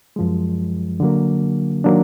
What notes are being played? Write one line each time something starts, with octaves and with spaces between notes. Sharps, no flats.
F#2 F3 G#3
D3 F#3 A#3
D#3 F#3 A#3 D4